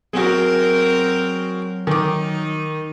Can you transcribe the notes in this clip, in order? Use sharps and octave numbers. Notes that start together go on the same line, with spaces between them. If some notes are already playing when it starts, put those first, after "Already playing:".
F#3 C4 F#4 G#4 A#4
D#3 D#4 D6